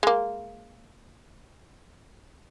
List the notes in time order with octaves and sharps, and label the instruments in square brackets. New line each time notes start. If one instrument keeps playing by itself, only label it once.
[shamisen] G#3 A#3